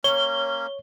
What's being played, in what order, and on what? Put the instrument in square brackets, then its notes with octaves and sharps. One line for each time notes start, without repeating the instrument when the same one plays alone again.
[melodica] A#3 C#4 [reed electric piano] C#5 [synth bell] G7